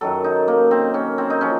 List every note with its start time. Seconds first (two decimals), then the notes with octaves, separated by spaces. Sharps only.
0.01 F#2 D#3 F#3 A4
0.24 D#4
0.48 A#3
0.71 C4
0.94 C#4
1.18 C4
1.30 D#4
1.41 C#3 F3 C#4